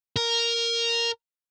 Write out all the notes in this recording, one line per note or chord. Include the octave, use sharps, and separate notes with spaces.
A#4